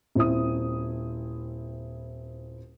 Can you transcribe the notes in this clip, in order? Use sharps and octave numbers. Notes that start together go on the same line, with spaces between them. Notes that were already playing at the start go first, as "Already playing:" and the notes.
D#1 C4 E4 D#6